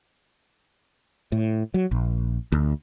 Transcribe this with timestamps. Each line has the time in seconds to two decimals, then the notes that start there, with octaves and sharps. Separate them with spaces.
1.32 A2
1.74 F#3
1.91 A#1
2.52 D2